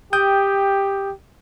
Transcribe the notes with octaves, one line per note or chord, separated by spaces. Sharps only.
G4 G5 D#6 G6